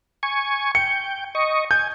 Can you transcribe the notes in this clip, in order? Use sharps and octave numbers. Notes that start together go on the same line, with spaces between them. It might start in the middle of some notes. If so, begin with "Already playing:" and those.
G#5 C#6
G5 C#7
D#5 C#6
G#5 G6